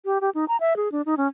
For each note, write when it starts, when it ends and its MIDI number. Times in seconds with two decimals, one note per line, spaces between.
0.05 0.18 67
0.21 0.30 67
0.35 0.45 63
0.48 0.57 82
0.60 0.76 76
0.76 0.91 68
0.92 1.02 62
1.06 1.15 63
1.17 1.28 61